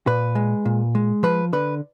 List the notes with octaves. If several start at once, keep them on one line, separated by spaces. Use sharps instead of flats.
A#2 B4
G#3
A#2
G#3
F3 B4
D3 B4